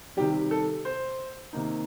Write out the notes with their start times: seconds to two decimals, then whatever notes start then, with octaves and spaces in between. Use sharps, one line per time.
0.17 C3 D#3 G3 G4
0.51 A4
0.85 C5
1.53 C3 D#3 A#3 D#4